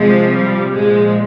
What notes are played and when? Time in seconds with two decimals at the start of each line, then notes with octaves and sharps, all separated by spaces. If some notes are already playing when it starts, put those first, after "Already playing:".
Already playing: C3 F3 G#3
0.31 G3
0.72 A#2 F3 G#3